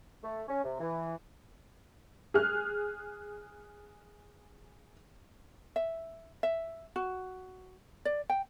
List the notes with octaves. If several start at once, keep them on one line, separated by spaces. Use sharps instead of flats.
A3
C#4
C3
E3
G#4 F6 F#6
E5
E5
F#4
D5
G5